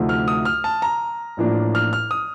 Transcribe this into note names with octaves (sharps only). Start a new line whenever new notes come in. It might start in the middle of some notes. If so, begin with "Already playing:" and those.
Already playing: D2 C3 F3 A3 D#4
F6
D#6
F6
A5
A#5
A1 A2 F3 A#3 D4
F6
F6
D#6